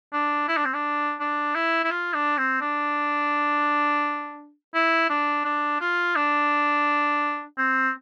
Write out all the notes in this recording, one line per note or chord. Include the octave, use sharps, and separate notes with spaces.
D4
E4
D4
C4
D4
D4
E4
E4
F4
D4
C4
D4
E4
D4
D4
F4
D4
C4